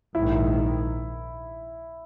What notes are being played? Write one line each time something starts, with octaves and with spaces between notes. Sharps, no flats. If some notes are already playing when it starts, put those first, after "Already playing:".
A#1 G#2 D#3 E4